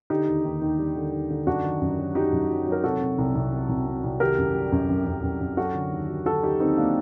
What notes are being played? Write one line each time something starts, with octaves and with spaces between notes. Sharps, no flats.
D3 D#4 G4
D#2
D#2
D#2
G3
D3
D#2
D3
F#2 D4 F#4
D#3
F#2
F#3
F#3 D#4 G4
F#2
F#3
F#3
A#4
C3 F#4 A4
C3
C2
C2
C3
C2
C3
C2
D#3 G4 A#4
F#2
G3
F#2
F#2
F#2
F#2
F#2
F#3 F#4 A4
D3
D#2
F#3
D3 F#4 A4
D#2 D#4 G4
D#2 C4 D#4
A#3 D4